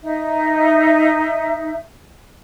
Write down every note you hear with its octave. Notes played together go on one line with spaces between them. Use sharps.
D#4 E5